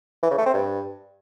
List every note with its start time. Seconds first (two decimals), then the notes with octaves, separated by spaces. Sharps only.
0.23 E3
0.31 C#3
0.38 A3
0.46 C4
0.54 G2